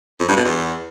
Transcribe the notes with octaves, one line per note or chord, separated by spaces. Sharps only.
F2
G2
B2
E2